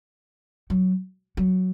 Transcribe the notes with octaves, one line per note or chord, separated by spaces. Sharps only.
F#3
F#3